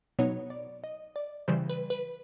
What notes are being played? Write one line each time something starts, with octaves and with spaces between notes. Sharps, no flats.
B2 F#3 B3 D#4 C#5
D5
D#5
D5
C#3 E3 G3 C5
B4
B4